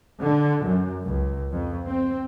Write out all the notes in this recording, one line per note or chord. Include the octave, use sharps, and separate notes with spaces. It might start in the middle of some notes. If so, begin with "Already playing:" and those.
D3
F#2
C#2
F2
C4